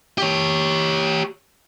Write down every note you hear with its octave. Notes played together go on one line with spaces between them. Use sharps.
G4 C#5